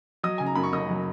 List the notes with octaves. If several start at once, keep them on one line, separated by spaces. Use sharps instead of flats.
F#3 D#5 D#6
C#3 G#5
A#5
F#2 B5
C#6
F#1 D#5 D#6
F#3